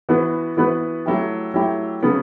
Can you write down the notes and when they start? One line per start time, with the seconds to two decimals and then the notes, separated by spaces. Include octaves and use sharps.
0.09 E3 B3 F#4 B4
0.57 E3 B3 F#4 B4
1.06 F#3 A3 E4 G4
1.54 F#3 A3 E4 G4
2.03 C#3 F#3 B3